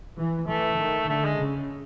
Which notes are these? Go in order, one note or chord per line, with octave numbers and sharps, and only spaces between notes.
E3
E3 A3
D#3
D3 A3
G#3
C#3